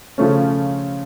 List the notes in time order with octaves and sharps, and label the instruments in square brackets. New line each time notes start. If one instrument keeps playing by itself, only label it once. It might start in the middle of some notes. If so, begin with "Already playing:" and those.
[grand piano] C#3 F3 A3 C#4